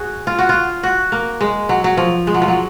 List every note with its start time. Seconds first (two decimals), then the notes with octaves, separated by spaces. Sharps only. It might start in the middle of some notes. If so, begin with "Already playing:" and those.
Already playing: F#4 G#4
0.27 F4
0.39 F#4
0.49 F4
0.83 F#4
1.12 A#3
1.41 G#3
1.69 F#3
1.84 F#3
1.97 F3
2.27 G#3
2.34 F#3
2.42 F3
2.48 F#3